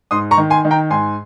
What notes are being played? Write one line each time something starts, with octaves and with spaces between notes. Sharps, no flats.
G#2 C6 D#6
A#5 C#6
D#3
G#5 C6
D#3
G5 A#5
G#2 G#5 C6